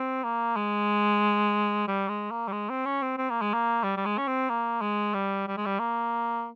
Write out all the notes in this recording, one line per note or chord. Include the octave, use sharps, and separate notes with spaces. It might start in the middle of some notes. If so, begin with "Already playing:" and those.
Already playing: C4
A#3
G#3
G3
G#3
A#3
G3
G#3
C4
C#4
C4
C4
A#3
G#3
A#3
G3
G3
G#3
C#4
C4
A#3
G#3
G3
G3
G#3
G3
A#3